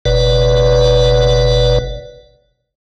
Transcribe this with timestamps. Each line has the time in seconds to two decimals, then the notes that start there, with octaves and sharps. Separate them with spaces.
0.05 F#1 B2 B4 D5